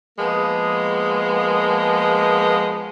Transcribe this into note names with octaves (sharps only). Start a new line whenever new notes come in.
F3 G#3 A#3 B3